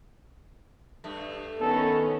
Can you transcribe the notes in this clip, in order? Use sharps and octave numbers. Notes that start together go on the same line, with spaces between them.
G2 A3
D#3 B3 C#4 A4